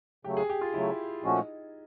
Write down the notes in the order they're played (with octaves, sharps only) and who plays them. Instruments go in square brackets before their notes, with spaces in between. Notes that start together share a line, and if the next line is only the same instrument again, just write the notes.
[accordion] C#3 F#3 A3 [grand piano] G4
[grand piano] G#4
G4
F4
[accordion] C#3 F#3 A3 [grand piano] E4
[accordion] A#2 F3 A3 C#4 F#4 [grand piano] D#4